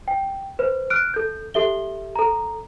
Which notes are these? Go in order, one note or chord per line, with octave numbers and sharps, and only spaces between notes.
G5
B4 C5
F6 F#6 D7
A4 G6
G4 A4 E5 G7
A4 A#5